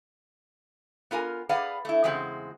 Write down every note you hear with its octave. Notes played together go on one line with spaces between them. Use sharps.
B3 F4 A#4 G#5
G#4 B4 D5 F5 F#5
A3 E4
E2 C#3 G#3 C4 F#4